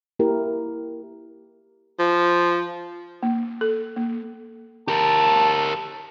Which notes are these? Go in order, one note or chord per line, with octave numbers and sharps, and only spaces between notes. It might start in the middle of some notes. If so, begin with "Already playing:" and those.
A#3 E4 G4 A#4
F3
A#3
A4
A#3
G4 A#4 A5